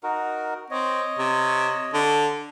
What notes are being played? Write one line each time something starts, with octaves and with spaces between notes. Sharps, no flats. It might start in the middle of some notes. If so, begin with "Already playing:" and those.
D#4 F#4 A#4
C4 C#5 D#5
C3
D3